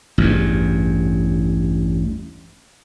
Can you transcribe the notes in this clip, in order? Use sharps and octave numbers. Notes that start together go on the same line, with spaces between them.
A1 E2 G2